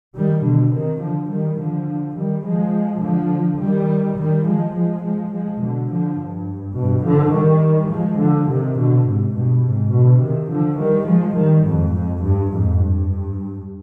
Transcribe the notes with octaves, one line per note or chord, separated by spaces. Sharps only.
D#3 G3
B2 D3
C3 D#3
D3 F3
D#3 G3
D3 F3
D#3 G3
F3 G#3
D3 F3
D#3 G3
D#3 G3
F3 G#3
F3 G#3
F3 G#3
F3 G#3
B2 D3
D3 F3
G2
G2 B2
D3 F3
D#3 G3
F3 G#3
D3 F3
C3 D#3
B2 D3
G#2 C3
G2 B2
G#2 C3
B2 D3
C3 D#3
D3 F3
D#3 G3
F3 G#3
D#3 G3
F2 G#2
F2
G2
F2 G#2
G2